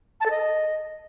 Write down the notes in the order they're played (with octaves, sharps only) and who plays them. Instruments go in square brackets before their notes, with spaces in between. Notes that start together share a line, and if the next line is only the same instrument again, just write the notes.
[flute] A5
A4
D#5